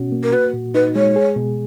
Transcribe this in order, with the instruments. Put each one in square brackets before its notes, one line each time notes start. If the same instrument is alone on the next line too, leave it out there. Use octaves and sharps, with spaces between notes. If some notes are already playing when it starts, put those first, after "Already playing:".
Already playing: [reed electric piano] B2 C#4 F#4
A#3
[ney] A#4
[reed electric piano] F#4 [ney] B4
[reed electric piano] A#2
[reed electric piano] D#4 [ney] B4
[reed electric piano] G#3 [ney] C#5
[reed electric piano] G#4
B2